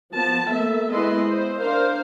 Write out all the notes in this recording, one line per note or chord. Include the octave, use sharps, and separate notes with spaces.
F3 B3 A5
A3 A#3 E5
G#3 B3 E4 B4 D#5 C6
C5
D4 A#4 C5 F5